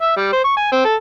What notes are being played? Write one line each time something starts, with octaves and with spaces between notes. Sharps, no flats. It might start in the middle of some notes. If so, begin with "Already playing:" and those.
E5
G3
C5
C#6
G#5
C4
A4